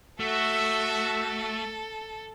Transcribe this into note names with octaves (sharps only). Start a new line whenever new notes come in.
A3 F#4 A4 E5